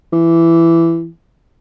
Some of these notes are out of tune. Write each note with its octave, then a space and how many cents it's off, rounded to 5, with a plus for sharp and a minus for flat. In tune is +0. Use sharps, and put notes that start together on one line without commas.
E3 +15